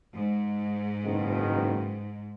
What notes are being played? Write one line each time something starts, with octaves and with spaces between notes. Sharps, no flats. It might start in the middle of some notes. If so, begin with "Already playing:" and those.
G#2
F#1 B2 D#3